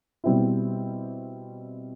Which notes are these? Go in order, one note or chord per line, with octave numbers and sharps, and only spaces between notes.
B2 G3 C4 E4